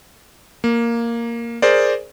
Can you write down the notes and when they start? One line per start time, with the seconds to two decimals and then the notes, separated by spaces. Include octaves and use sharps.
0.64 A#3
1.62 G#4 A#4 C5 D5